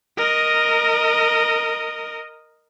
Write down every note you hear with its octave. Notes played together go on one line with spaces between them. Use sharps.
A#4 D#5